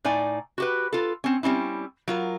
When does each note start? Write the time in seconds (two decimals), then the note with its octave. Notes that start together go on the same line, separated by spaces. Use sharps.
0.05 A2 D#4 D5 G#5
0.58 F#4 G4 B4
0.93 F4 A4
1.24 C4 C#4
1.43 G3 C4 C#4 E4
2.08 F#3 F4 A#4